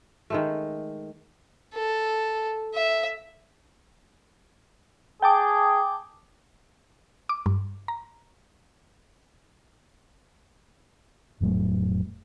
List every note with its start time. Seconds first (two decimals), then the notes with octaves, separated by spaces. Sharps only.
0.30 D#3 G#3 A3
1.74 A4
2.74 E5
5.22 G#4 G5 A5 D6
7.29 D6
7.46 G2
7.88 A#5
11.41 F1 A2 F#3 A3